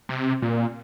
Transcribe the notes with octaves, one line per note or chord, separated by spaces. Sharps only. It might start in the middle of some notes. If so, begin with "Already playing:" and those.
C3
A#2